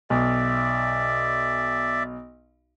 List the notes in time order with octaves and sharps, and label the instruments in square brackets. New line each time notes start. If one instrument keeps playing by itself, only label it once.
[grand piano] B1 [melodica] D5 E5